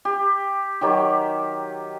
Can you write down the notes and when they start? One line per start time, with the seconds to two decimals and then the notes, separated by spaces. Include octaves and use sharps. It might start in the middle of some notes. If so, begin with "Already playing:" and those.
0.05 G4
0.81 D#3 F#3 G4